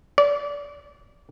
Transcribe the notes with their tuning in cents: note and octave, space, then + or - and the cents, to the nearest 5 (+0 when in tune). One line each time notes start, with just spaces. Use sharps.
D5 -30